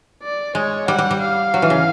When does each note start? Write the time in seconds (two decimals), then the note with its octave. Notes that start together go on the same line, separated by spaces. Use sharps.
0.23 D5
0.55 G#3 C#5
0.88 G3 F#5
0.99 G3
1.11 G3
1.21 F5
1.54 F#3
1.62 E3
1.70 C#3